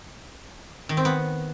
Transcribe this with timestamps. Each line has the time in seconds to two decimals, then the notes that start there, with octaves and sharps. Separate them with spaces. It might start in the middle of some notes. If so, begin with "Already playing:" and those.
0.89 D#3
0.97 C4
1.05 B3